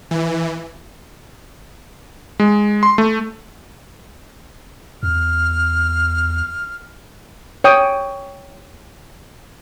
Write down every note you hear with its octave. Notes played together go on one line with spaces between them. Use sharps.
E3
G#3
C6
A3
E2 F6
C#5 G5 D#6